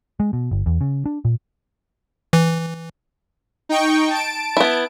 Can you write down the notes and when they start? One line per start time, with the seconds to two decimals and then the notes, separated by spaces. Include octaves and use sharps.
0.20 G#3
0.33 B2
0.51 G1
0.66 E2
0.81 C#3
1.06 D4
1.25 A#2
2.33 E3
3.69 D#4 G5 C#6
4.10 A5 D7
4.57 B3 E4